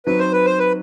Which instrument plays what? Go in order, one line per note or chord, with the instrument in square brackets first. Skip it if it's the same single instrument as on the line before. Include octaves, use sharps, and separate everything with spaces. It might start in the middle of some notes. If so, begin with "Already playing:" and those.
[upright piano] F#3 C4 D#4 [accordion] B4
[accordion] C5
B4
C5
B4